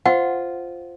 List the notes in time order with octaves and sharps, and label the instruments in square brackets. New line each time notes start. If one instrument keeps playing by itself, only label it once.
[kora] F4 [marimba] C5 [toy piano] F#5